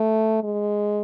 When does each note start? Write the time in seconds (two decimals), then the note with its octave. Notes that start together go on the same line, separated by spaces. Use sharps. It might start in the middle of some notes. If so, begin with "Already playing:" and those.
Already playing: A3
0.44 G#3